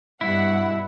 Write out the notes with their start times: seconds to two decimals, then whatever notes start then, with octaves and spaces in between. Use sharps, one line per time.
0.21 G2 B2 E4 F#5